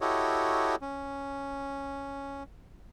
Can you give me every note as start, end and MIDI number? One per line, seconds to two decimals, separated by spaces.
0.01 0.75 64
0.01 0.75 66
0.01 0.75 67
0.01 0.75 69
0.01 0.75 73
0.01 0.75 75
0.82 2.43 61